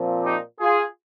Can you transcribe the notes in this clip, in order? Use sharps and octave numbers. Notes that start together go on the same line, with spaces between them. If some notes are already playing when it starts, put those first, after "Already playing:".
Already playing: A#2 F3 C4
D#4 G4
F4 G#4